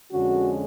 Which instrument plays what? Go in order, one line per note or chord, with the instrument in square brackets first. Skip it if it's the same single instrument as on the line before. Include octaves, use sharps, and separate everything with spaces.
[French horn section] F2 D3 G#3 C#4 F#4